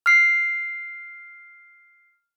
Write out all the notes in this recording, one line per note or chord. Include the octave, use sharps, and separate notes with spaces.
F6 C7